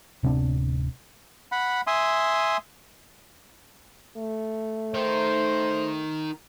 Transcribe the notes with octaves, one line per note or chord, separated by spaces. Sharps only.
D1 C3 B3 D4
F#5 B5
E5 G#5 C6 D#6
A3
D#3 D#4 C5